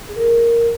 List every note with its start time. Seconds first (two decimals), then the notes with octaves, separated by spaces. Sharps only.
0.09 G#4
0.16 A#4